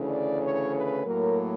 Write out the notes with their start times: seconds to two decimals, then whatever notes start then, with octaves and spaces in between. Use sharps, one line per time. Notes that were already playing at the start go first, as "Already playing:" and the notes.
Already playing: D2 C#3 E3
0.08 D5
0.40 C#5
0.73 B4
1.04 A2 F#3 A#3 A#4